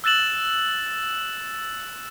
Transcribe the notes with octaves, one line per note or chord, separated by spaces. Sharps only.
E6 F#6 A6 E7 F#7